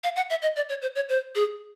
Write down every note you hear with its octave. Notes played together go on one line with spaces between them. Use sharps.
F5
F#5
E5
D#5
D5
C#5
C5
C#5
C5
G#4